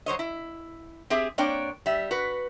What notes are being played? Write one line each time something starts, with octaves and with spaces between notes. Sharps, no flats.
F#3 C5 C#5 D#5
E4
C4 G4 G#4 E5
A#3 C4 D4 C#5 D5 G5
G3 E5
F#4 B4